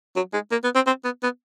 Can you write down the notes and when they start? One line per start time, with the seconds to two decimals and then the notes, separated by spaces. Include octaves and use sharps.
0.16 F#3
0.33 G#3
0.51 A#3
0.64 B3
0.75 C4
0.86 C4
1.04 B3
1.23 B3